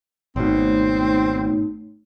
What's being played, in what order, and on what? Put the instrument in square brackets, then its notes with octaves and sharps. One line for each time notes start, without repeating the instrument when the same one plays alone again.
[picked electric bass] G#1 B2 [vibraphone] A3 D#4 C#5 [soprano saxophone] C4